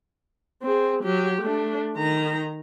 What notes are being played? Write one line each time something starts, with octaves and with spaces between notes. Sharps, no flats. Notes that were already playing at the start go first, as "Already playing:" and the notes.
C4 G#4
F#3 G4
A3 D4
D#3 A#5